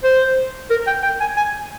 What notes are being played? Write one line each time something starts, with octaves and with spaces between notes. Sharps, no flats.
C5
A#4
G5
G5
G#5
G#5